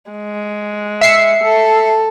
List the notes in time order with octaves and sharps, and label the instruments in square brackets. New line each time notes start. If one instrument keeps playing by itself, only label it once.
[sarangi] G#3
[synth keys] E5 C7 C#7
[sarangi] A4